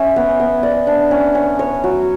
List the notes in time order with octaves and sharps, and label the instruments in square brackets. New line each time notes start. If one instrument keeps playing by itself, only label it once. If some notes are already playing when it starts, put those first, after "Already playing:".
Already playing: [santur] C#4 E5
B3
B3
D5
D4
C#4
C#4
C#5
F#3